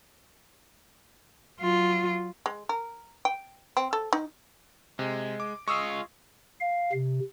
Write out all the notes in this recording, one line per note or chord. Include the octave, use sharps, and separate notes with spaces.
F#3 F4
G#3
A#4
G5
C4
A4
D#4
C3 G#3
D6
G#3 F4 C#6 D#6 E6
F5
C3